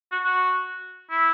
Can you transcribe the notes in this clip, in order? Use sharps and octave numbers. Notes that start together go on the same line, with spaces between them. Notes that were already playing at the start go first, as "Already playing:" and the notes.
F#4
F#4
E4